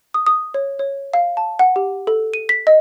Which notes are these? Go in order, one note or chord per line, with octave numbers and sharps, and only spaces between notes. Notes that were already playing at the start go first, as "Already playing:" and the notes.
D#6
D#6
C#5
C#5
F5
A5
F#5
G4
A4
D#7
B6
D#5